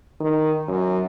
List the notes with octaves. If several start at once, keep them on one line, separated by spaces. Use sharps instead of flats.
D#3
F#2